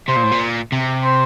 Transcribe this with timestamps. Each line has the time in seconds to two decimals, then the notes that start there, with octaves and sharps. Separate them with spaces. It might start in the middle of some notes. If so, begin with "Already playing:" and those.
0.08 C3 C5
0.17 A#2
0.24 A2
0.32 A#2
0.72 C3
1.04 C5